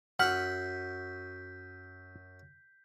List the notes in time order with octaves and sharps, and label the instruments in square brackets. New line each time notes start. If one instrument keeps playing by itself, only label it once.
[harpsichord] F#2 E5 C6 [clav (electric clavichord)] F#5 [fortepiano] F6 [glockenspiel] G6 B6